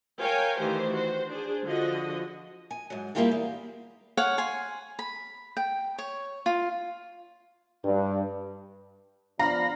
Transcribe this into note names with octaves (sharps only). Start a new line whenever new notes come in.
A#4 C#5 F5 G5 G#5
D#3 E3 A3 G4 C5
F#4 C5
D4 G#4 C5
D3 F3 F#4 D#5
G#5
G#2 F#3
G3 A#3 E4 F4 G4 G#4
E2
C#5 F5 F#5 G#5
G#5 C6
B5
G5
C#5
F4
G2
F3 B3 D4 F5 A#5 B5 A#6